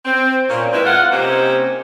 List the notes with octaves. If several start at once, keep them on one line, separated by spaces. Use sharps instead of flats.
C4
A#2 C#4
G#3 C4 E4 A#4 B4
F2 F4 F5 F#5
C3 A#3 C#4 D#4 G4 C5